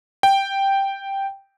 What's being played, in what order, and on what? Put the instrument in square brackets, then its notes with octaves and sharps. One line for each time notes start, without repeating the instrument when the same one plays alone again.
[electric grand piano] G5